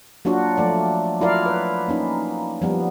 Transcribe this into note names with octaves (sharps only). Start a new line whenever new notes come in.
F#3 A#3 D4 F4 F#4
F3 A3 D5
F#3 E4 F4 A#4 D5 F5
B4
A#3 C#4 D#4
F3 G3 B3